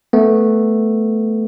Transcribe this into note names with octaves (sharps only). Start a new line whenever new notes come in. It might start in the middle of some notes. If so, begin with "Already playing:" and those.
A3 B3